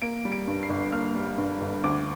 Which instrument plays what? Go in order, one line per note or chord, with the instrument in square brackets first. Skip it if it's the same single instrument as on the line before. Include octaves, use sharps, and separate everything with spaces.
[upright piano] A#3 D7
G3
D7
G2
C7
G1
A#3 F6
G3
G2
G1
D2 D6